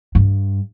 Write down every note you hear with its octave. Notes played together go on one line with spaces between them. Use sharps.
G2